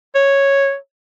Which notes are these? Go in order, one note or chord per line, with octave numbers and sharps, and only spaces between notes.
C#5